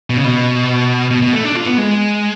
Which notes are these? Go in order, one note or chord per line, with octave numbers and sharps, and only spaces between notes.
B2
C#3
B2
B2
B2
A3
D4
F4
B3
G#3